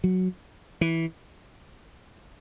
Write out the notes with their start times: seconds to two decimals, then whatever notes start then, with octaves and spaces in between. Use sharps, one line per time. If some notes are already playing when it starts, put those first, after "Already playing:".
0.04 F#3
0.81 E3